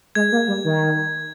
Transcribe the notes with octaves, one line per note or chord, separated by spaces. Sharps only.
G#3 G#6
A#3
G3
D#3